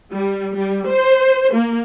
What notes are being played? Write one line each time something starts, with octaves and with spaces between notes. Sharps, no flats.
G3
G3
C5
A#3